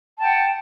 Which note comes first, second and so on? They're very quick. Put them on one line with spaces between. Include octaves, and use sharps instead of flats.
A5 G5 F#5